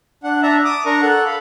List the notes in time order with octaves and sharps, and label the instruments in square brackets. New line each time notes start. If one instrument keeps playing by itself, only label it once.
[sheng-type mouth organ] D4 F#5
D4 E5 A5 A#5
D6 D#6
D4 A#4 A#5 C#6
A4 F#5
F5 B5